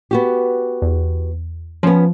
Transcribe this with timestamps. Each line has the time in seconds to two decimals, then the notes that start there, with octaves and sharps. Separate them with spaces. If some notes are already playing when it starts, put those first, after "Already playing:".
0.11 B3 F#4 G4
0.82 E2
1.83 F3 B3 C#4